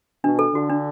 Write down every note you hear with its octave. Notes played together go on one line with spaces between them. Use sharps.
B2 D4
A4
D3 F#4
D4